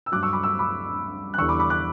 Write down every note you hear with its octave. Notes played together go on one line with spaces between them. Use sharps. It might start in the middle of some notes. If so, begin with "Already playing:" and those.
E6
G2 F#3 D6 F#6
C#6 E6
B5 D6
C#6 E6
B5 D6
F#6
E2 D3 G3 C#6 E6
B5 D6
B5 D6
D6 F#6